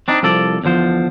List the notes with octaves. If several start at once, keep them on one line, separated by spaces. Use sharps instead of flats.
C4 D4 D#4
C2 F3 A4 D5
E2 D3 F3 C5